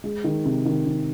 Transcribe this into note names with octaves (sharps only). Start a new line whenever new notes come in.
G#3
D#3
C3
D#3
C3